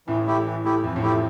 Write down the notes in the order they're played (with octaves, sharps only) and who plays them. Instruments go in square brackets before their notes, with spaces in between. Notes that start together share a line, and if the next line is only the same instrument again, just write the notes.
[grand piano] A1 A2 [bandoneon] E3
[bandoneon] A3 E4 G4
E3
A3 E4 G4
[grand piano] F2 [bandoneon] E3
[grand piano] A1 A2
[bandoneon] A3 E4 G4
[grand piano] F3